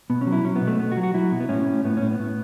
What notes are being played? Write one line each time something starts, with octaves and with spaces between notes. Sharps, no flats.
B2 B3
C#4
F#3
E4
F#3 C#4
B3
B2
A3
B2 B3
F#4
F#3
F#4
F#3 E4
B2
B3
A2 C#4
A2
A2 B3
C#4
A2
B3
A2